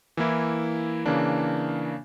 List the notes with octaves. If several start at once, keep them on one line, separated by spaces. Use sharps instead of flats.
E3 A#3 E4
C#3 E3 A#3 D4